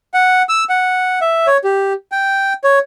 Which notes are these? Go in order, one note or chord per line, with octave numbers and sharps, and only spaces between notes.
F#5
E6
F#5
E5
C#5
G4
G5
C#5